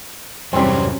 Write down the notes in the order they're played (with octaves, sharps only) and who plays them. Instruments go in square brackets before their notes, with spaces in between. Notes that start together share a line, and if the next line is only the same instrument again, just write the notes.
[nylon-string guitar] E2 C3 [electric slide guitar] G2 F#3 C#4 [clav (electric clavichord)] G3 C4